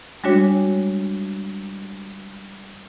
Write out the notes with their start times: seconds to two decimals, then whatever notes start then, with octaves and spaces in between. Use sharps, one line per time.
0.24 G3 G#3 D4 F#4 C#5